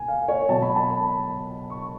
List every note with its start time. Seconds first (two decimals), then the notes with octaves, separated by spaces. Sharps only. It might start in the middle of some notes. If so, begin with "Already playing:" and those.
Already playing: B2 G#5
0.08 F5
0.28 C#5
0.49 B2 F#3 A5
0.62 B5
0.76 A5
0.89 B5
1.70 C#6